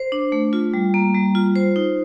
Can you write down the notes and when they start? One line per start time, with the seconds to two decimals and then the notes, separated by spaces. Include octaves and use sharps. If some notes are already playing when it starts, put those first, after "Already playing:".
Already playing: C5
0.12 D4
0.32 A3
0.53 F4
0.74 G3
0.94 A#3
1.15 G3
1.35 F4
1.56 C5
1.76 D#4